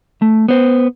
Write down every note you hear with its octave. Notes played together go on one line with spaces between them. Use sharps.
A3
B3 C5